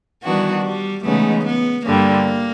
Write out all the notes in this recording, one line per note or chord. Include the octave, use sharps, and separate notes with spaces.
D#3 E3 G3 B3 D4 F#4
G3
C#3 E3 G#3 A3 B3 D#4
B3
G2 D3 G3 A#3